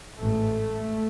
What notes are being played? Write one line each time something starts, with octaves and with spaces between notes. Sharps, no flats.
A1 G#2 A3